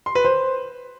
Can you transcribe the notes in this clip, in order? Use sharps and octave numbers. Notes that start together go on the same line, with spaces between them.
C6
B4
C5